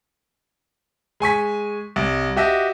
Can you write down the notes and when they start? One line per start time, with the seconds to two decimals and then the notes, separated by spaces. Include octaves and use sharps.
1.20 G#3 G#5 C#6 B6
1.96 C2
2.36 F#4 G4 D#5 E5